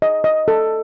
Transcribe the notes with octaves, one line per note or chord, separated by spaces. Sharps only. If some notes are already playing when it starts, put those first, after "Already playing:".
D#5
D#5
A4